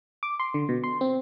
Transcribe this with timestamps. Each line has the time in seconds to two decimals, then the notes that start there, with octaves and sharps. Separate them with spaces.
0.23 D6
0.40 C6
0.54 D3
0.69 B2
0.84 C6
1.01 C4